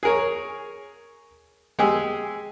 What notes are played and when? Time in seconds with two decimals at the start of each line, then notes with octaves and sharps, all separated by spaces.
0.03 G#4 A#4 C#5
1.79 G#3 G4 G#4 E6